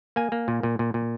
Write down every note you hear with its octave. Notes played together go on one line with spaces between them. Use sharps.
A#3 G#5
A#3
A#2
A#2
A#2
A#2